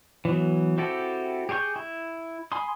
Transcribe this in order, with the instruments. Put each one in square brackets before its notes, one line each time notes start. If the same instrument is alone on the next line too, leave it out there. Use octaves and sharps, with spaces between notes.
[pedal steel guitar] E3 F#3 B3
C4 E4 F#4 G4 A4
G4 G#4 C#5 C#6 G6
E4
G#5 B5 C6 D#6